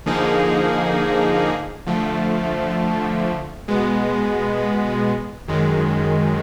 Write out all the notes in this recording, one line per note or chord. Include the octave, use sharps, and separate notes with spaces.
D3 F3 A#3 D#4 G#4
D3 F3 A3
B2 G#3 B3
F#2 D#3 G#3